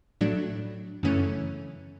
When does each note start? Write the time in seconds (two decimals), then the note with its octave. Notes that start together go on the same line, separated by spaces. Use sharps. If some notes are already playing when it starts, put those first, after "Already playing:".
0.21 A2 F#3 A3 D4
1.03 F#2 C#3 E3 A3 C#4